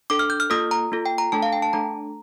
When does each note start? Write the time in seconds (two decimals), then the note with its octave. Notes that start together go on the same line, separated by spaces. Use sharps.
0.10 D4 A4 D6
0.19 F6
0.30 G6
0.40 F6
0.50 A#3 F4 A4 D#6
0.71 A#5
0.92 A#3 F4 A4
1.06 G5
1.18 A#5
1.32 A3 D4 A4 A5
1.42 F5
1.52 G5
1.62 A5
1.73 A3 D4 A4 A#5